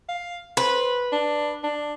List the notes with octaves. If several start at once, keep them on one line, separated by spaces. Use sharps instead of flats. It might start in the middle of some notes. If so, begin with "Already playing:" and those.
F5
B4 C5
D4
D4